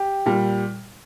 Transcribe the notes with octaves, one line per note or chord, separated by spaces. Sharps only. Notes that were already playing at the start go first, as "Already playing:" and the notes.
Already playing: G4
A#2 G3